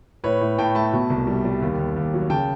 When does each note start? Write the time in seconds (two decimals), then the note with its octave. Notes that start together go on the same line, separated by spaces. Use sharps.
0.24 A2 B4 C#5
0.41 A2
0.58 A2 G5 A5
0.75 A3 A5 B5
0.93 B2
1.10 C2
1.27 G3
1.45 G3
1.62 D#2
1.79 D#2
1.96 D#2
2.14 F#3
2.30 C#3 G5 A5